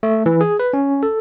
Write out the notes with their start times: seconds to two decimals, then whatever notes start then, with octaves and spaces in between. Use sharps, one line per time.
0.03 A3
0.26 E3
0.41 G#4
0.60 B4
0.73 C#4
1.03 A4